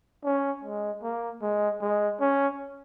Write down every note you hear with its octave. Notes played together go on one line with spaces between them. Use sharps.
C#4
G#3
A#3
G#3
G#3
C#4